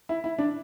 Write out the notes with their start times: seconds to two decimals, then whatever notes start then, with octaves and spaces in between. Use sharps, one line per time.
0.09 E4
0.24 E4
0.38 D4